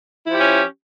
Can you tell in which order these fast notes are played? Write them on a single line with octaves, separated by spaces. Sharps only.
E4 F3 G4 C#4